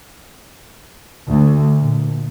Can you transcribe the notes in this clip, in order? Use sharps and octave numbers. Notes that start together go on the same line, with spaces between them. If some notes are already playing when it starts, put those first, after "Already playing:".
D2
A#2